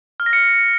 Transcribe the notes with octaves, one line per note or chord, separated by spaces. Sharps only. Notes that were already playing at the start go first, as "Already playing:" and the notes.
F6
A#6
C#7